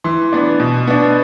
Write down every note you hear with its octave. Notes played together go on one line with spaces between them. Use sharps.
E3 C6
B3 D4
B2
B3 D4